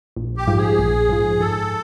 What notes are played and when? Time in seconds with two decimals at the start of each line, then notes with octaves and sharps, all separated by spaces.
0.16 A#1
0.37 G4
0.47 G#2 F3
0.58 G#4
0.78 A#1
1.09 G#2 F3
1.40 G#2 A4